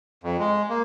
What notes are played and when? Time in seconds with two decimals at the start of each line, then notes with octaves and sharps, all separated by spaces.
0.24 F2
0.39 G#3
0.69 A#3